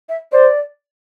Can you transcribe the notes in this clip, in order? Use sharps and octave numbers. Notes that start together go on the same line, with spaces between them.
E5
C5 D5